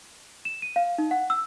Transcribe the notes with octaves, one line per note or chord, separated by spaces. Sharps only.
E7
D#7
F5
D#4
F#5
E6